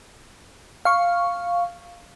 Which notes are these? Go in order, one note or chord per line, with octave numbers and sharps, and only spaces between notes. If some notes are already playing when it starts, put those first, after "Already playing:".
F5 C#6